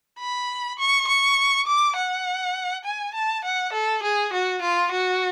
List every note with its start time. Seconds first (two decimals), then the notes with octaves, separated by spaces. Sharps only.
0.20 B5
0.79 C#6
1.07 C#6
1.67 D6
1.96 F#5
2.85 G#5
3.15 A5
3.44 F#5
3.73 A4
4.03 G#4
4.33 F#4
4.62 F4
4.92 F#4